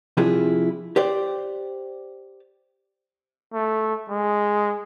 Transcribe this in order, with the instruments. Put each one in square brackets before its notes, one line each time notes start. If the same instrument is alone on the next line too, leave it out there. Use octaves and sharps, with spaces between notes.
[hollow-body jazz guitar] C3 F3 D4 E4 F4 G#4
G4 C5 D5
[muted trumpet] A3
G#3